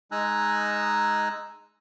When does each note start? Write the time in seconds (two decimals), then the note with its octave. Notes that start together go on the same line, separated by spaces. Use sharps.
0.12 G#3 D#4 G#5 A#5 E6 F#6